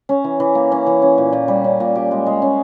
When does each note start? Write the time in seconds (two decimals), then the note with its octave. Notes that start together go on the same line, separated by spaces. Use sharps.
0.09 C#4
0.24 E3
0.40 E3
0.55 A#3
0.72 C#4
0.87 E3
1.02 C#4
1.18 A#2
1.33 A#2
1.48 G3
1.64 C#4
1.80 A#2
1.95 G4
2.11 G#3
2.26 G#3
2.42 C#4